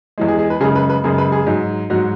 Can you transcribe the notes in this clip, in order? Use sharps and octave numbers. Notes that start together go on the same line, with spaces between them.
E2 E3 G#3
G#4
G#4
B4
F#2 C#3 G#3 G#4
B4
B4
F#2 C#3 G#3 G#4
B4
G#4
G#2 F#3
G#2 F#3 F#4